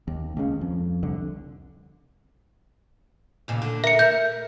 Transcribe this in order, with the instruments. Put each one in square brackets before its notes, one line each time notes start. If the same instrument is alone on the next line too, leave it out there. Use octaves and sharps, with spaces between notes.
[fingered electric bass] D#2
C#2 C#3
F2
C2 D3
[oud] D#2 A#2 C#3
D3
[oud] A#4 [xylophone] E5 C#7
[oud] A#4 E5 [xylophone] G6